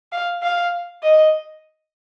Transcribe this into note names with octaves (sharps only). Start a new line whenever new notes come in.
F5
F5
D#5